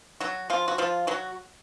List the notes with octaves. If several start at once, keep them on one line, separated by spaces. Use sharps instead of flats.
F#3 F#4
F3 F4
F#4
F3 F4
F#3 F#4